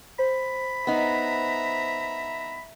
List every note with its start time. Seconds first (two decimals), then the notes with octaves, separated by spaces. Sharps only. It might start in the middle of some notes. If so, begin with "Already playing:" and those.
0.19 C5 B5
0.87 B3 D#4 E5 A#5